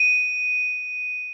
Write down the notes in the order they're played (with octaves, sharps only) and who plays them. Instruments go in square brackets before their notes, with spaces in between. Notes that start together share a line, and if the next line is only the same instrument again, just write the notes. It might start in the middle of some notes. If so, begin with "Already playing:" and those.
Already playing: [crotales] D#7